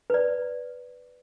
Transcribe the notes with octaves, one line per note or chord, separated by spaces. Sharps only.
B4 D5